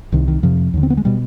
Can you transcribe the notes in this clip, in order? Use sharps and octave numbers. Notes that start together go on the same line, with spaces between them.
C2 C3 D#3
D#3
F2 C3 F3
D#2 D3
C4
B3
G#3
B2 G3